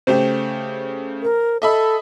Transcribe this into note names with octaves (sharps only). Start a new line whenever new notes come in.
C#3 A3 G4 C5
A#4
A4 D#5 E5 B5